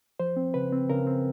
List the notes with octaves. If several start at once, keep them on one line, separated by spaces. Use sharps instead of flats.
F3 C5
C4
C#3 B4
C4
C#3 A#4
C4